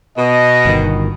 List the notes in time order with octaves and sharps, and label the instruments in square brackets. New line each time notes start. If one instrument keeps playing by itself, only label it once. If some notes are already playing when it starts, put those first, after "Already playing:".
[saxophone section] B2 [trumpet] D#5
[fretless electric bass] G1 D#3